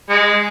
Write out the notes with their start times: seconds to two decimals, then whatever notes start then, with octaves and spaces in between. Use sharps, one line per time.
0.09 G#3